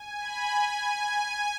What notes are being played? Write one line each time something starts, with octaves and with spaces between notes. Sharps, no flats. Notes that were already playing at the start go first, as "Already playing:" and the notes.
Already playing: G#5
B5
G#5